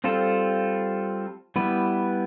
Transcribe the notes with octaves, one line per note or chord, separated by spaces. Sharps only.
G3 C4 F4 A4
G3 B3 E4 B4